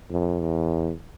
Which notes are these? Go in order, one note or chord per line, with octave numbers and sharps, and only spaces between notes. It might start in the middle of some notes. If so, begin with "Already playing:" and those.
F2
E2